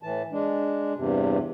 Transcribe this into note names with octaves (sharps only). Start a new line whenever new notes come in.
A2 E3 A5
G#3 D4
E2 G2 C3